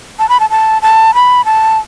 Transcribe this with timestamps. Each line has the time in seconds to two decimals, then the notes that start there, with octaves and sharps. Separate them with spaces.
0.19 A5
0.29 B5
0.40 A5
0.50 A5
0.82 A5
1.15 B5
1.45 A5